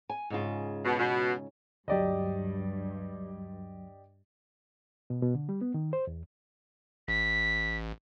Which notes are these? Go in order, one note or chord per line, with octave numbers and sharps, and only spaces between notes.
G#5
G#2 C#3 F4
B2
B2
D2 G2 F#3 G4 D5 D#5
B2
B2
D3
G3
B3
D#3
C5
E2
A1 B6